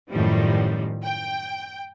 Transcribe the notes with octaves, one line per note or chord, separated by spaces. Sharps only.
F#2 A2 D#3 F3 G3
G5